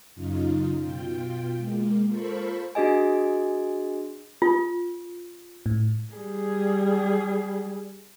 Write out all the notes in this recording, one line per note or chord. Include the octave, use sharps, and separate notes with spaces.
F#2 C#3 D#4 F4
B2 F4 G5
G#3 A#3
F4 A4 A#4 C5 B5 C#6
D4 F#4 G#4 D#5 G#5
F4
A2
G3 G#4